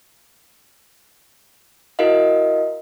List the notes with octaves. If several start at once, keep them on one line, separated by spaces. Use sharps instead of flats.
E4 F#4 A#4 D#5 F5